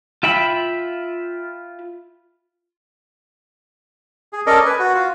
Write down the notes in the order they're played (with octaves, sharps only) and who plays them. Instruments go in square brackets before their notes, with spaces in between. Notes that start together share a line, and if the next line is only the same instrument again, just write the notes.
[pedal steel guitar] F4 E5 G5 B5
[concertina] G#4
C#4 A4 A#4 D5 D#5
B4 G#5
F#4
F4 F#4